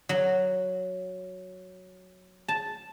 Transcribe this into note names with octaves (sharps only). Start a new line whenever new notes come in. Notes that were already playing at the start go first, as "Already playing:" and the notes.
F#3
A5